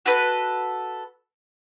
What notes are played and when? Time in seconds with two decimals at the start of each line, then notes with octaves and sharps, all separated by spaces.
0.06 F#4 A4 B4 F#6